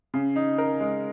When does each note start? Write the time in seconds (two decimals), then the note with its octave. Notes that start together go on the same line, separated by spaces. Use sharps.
0.14 C#3
0.36 D#4
0.58 A#4
0.80 G#3